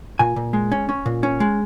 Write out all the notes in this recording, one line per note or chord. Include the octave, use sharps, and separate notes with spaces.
A#2 G#5
A#2
G#3
C#4
C#4
A#2
C#4
G#3